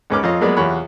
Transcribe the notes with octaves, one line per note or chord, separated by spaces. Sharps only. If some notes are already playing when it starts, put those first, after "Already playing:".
C#2 G#2 C#4 B4 D6 F6
F2 F4 C#5 D#5
F#3 G#3 A#3 B3 B4 D5
E2 C3 F4 C#5 F#5 B5